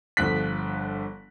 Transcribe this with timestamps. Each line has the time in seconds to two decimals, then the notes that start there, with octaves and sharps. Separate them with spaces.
0.17 G1 D3 F3 F#6 B6